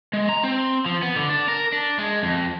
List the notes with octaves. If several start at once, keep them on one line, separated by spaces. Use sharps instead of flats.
G#3
A#5
C4
F3
B3
D3
D4
A#4
D4
G#3
F2